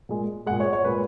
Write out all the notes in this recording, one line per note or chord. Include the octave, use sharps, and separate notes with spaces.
A#2 G#3
A#2 G#3 F#5
C#5
C#5
A#2 G#3 B4